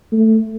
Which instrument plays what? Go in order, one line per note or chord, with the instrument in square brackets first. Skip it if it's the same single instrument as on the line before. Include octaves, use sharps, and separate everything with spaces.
[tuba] A3